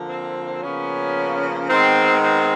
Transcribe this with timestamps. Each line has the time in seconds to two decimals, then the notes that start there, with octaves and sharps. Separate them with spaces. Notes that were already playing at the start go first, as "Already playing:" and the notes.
Already playing: D3 F3 A#3
0.09 C4
0.62 C#3 F3 A#3 B3 C#4
1.70 D#3 G#3 B3 C4
2.24 C4